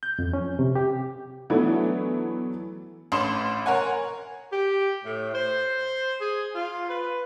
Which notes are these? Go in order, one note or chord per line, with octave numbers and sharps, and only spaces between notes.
G6
F2
C#4
C3
G4
E3 F#3 A3 B3 D4 E4
A1 C#4 B5 C6 E7
A#4 C#5 F#5 G#5
G4
A2
C5
G#4
F4
B4